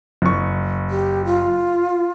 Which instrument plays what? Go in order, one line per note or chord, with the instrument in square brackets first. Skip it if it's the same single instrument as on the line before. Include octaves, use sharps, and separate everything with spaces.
[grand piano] F#1 C#6
[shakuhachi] G4
F4